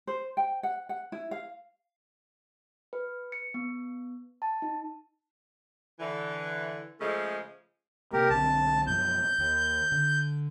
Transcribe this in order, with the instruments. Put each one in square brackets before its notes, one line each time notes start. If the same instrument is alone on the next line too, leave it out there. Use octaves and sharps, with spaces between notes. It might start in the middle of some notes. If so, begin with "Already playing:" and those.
[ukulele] C5
G5
F#5
F#5
E4
F5
[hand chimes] B4
C#7
B3
A5
D#4
[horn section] D3 E3
C#3 F3 G#3 A3
[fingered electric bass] C3 A#3 [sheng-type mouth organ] G4 A#4
[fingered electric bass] B1 D3 C4 [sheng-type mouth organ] A5
[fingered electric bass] F#2 B2 F3 [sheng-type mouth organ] G6
[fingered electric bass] D#2
D3